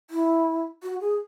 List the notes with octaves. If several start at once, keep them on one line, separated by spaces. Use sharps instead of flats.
E4
F#4
G#4